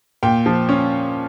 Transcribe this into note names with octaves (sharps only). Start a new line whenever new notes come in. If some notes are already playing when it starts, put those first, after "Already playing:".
A#2 G5
F3
C#4